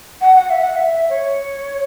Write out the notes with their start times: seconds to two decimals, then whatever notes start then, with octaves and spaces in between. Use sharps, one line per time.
0.21 F#5
0.36 F#5
0.50 E5
0.61 F#5
0.72 F#5
0.76 E5
1.10 C#5